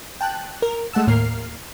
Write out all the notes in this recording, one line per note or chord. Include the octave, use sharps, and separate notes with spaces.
G5 A5 F#6
A#4
G#3 A3 F#5 A5 E6
D#2 A2 A#3 A#4 F6 C7